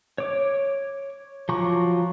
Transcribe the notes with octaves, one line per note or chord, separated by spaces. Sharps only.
C#5 D6
F3 F#3 A#5 C#6 D6